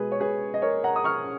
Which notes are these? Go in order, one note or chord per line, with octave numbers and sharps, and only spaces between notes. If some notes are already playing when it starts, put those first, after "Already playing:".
Already playing: B2 G#3 G#4 B4
C#5
G#4 B4
D#5
A#4 C#5
F#5 A#5
D#6
C#6 F6